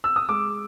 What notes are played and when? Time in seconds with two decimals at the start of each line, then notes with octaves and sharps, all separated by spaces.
0.04 E6
0.16 D#6
0.29 G#3 D6